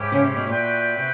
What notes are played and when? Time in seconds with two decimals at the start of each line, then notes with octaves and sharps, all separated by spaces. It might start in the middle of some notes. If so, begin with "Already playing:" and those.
Already playing: G#2 C#4 E4 G4
0.12 C#3
0.23 C3
0.36 B2
0.47 A#2 F#4 B4 E5 G5
0.97 C3